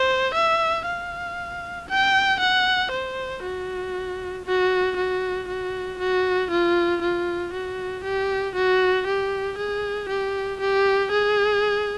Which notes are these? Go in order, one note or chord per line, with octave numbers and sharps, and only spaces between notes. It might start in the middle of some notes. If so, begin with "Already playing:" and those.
Already playing: C5
E5
F5
G5
F#5
C5
F#4
F#4
F#4
F#4
F#4
F4
F4
F#4
G4
F#4
G4
G#4
G4
G4
G#4